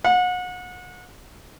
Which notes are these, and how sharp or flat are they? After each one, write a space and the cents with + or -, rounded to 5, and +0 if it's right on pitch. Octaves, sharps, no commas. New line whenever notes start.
F#5 -35